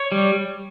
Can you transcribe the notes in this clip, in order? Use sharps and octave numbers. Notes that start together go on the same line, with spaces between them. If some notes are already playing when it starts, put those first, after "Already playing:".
Already playing: C#5
G3